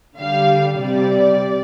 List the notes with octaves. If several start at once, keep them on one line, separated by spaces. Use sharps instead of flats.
D3 G3 F5
C3 G3 D5